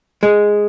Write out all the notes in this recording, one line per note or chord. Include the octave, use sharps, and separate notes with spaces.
G#3